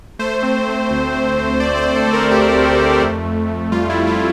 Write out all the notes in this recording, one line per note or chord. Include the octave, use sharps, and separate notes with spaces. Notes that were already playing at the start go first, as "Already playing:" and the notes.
A3 C5
C4
A3
D2
C4
A3
A3 D5
C5
C4
A4
A3
A#4
C4 G4
D2
A3
F2
F2
F2
G3 F4
F4
E4
F2
F4